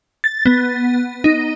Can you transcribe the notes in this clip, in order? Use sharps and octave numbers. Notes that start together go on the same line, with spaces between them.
A6
B3
D#4